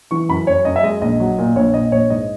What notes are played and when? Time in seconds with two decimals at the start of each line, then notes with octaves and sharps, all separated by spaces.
0.11 E3 C#6
0.29 F#2 B5
0.47 F#2 C#5
0.65 F#2 D#5
0.76 E5
0.83 G#3 D#5
1.02 A#1 D#5
1.20 F#3
1.38 A#2
1.56 A#1 C#5
1.74 A#2 D#5
1.92 A#1 C#5
2.10 G#2 D#5